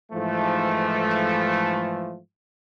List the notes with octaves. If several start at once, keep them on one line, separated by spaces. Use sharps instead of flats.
G#2 E3 F3 A3